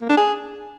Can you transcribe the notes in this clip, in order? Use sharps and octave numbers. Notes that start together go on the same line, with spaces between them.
A#3
D4
G#4